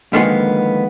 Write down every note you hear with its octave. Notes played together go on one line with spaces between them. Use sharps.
D3 D#3 F3 G#3 A#3 B3